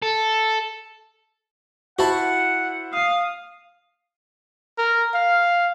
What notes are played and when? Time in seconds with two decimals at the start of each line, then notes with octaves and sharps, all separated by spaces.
0.03 A4
1.99 E4 F#4 C5 F#5 A5 B5
2.93 F5 D#6
4.78 A#4
5.15 F5